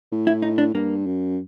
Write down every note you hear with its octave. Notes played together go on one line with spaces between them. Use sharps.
A2
E4
D#4
D4
G2 A#3
F#2